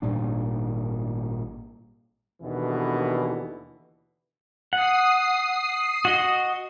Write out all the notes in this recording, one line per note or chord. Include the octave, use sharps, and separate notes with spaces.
G#1 A#2 G3 D4
D#2 B2 D3 E3
F#5 D#6 C7
F#4 D#5